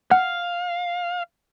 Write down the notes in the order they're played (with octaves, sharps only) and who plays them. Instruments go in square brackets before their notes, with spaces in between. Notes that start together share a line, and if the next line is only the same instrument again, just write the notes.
[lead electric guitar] F5 [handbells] F#5